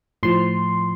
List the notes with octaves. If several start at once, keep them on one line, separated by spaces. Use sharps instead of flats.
A2 F3 C6